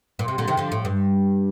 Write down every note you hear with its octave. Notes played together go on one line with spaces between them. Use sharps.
A#2
C3
A#2 D3
C3 D#3
D3 F3
A2
G2